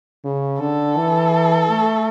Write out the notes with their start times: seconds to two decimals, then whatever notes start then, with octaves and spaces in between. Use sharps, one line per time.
0.24 C#3
0.60 D3 A4
0.97 E3
1.70 A3